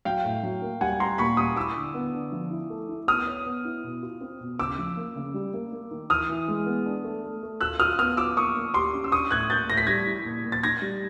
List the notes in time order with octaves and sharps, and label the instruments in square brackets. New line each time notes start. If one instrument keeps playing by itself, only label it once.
[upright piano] F#3 [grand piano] F5 G5
[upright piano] A2
F#3
A#3
[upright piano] G3 [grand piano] F#5 G#5
[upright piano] G3 [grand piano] A#5 C6
[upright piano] A#2 [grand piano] B5 C#6
[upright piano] G3 [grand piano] C#6 D#6
[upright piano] E4 [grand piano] D6 E6
[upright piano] D3
B3
D3
F3
E4
A3
E4
[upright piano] B3 [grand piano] D#6 F6
[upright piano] C#5
B3
E4
B2
F4
C4
B2
[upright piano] C#3 [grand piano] D6 E6
[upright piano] F3
A#3
C#3
G3
A#3
A#3
D#3
[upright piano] E3 [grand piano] D#6 F6
[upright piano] E3
G#3
B3
D4
A3
A3
A3
[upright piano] F4 [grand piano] E6 F#6
[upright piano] F4 [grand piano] D#6 F6
[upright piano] B3 [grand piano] D#6 F6
[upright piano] F4 [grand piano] D6 E6
[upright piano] A#3 [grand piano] C#6 D#6
[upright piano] A#3
[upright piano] G4 [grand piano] C6 D6
[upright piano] C#4
[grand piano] E6
[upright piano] D4 [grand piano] C#6 D#6
[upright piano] A2 [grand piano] F#6 G#6
[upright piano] A#3 [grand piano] G6 A6
[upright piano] A2 [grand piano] A#6
[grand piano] B6
[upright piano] G3 [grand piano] G#6 A#6
[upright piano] E4
A#2
A#2
[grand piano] A6
[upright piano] D#4 [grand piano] G#6 A#6
[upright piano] G3